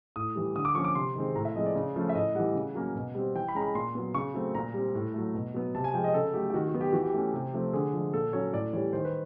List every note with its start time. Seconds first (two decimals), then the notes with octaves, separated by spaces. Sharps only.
0.16 A2 D#6
0.35 E3 G3
0.56 D3 D#6
0.65 D6
0.75 F3 A#3 C#4 C#6
0.84 D6
0.95 C3 C6
1.15 D#3 G#3 C4
1.35 A2 A#5
1.45 E5
1.55 F3 G#3 C4 D#5
1.66 D5
1.76 C#3
1.96 F3 A3 C#4
2.09 E5
2.15 A2 D#5
2.35 E3 G3 F#5
2.55 C#3
2.75 F#3 A#3 C#4
2.95 B2
3.15 G3 C4
3.35 E3 G5
3.48 B5
3.55 G#3 C#4 A#5
3.62 B5
3.75 A#2 C6
3.95 F#3 B3
4.14 C#3 C#6
4.34 F#3 A3 C4
4.55 A#2 A#5
4.74 G3 C4
4.95 A2
5.14 F#3 A3
5.34 B2
5.54 F#3 B3
5.75 C3 A5
5.84 G#5
5.94 F3 G#3 G5
6.04 D#5
6.14 C#3 A4
6.34 F#3 A3 G4
6.50 G4
6.54 D#3 F#4
6.68 F#4
6.74 F#3 B3
6.81 G4
6.92 E3 F#4
7.04 G4
7.14 A3 C#4
7.34 C3
7.54 F3 A3 C4
7.73 D3 G#4
7.93 F3 G#3
8.13 A#2 A4
8.33 F#3 A#3 C#4 C#5
8.53 A2 D5
8.73 E3 G3 C#5
8.93 D#3 C5
9.05 B4